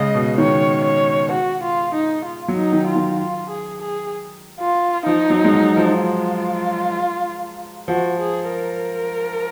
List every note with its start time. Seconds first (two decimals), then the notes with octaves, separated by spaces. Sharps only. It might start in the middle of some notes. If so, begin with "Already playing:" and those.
Already playing: C#3 G#3 D#5
0.14 B2
0.37 D#3 C#5
0.85 C#5
1.32 F#4
1.64 F4
1.95 D#4
2.25 F4
2.48 F#3
2.57 D#4
2.72 D#3
2.88 F4
2.96 D#3
3.20 F4
3.50 G#4
3.82 G#4
4.60 F4
5.06 F3 D#4
5.30 F#3
5.45 G#3
5.54 F#3
5.77 F3
6.01 F4
7.88 F3 F#4
8.20 G#4
8.51 A#4